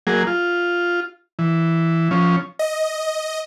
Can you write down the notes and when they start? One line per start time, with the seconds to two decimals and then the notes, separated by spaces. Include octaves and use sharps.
0.07 F#3 A#3 G#4
0.27 F4
1.39 E3
2.11 F3 C#4
2.59 D#5